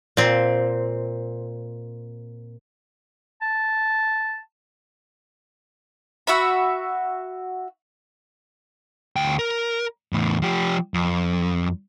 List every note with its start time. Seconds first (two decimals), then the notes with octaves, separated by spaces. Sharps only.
0.17 A#2 C4
3.42 A5
6.27 F#4 E5 B5
9.16 D2 G5
9.39 A#4
10.13 E2 A2
10.42 F3 G4
10.94 F2